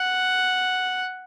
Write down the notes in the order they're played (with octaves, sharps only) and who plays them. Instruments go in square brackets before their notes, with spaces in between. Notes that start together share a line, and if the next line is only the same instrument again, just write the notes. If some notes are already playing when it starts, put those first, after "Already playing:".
Already playing: [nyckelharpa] F#5